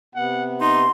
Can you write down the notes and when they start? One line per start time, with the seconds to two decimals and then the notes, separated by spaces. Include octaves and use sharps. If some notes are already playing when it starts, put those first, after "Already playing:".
0.15 C3 B3 F#5
0.61 D#4 C6